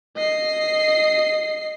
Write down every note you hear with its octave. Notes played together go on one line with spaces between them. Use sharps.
D#5 C7